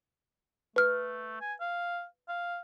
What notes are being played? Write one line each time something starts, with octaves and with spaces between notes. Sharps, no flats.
A3 B4 F6
G#5
F5
F5